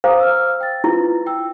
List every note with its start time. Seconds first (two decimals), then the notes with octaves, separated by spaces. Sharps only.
0.04 C5 F5 A#5 D6 D#6
0.20 E6 F6
0.61 G5 A6
0.84 E4 F4 B4
1.27 G5 E6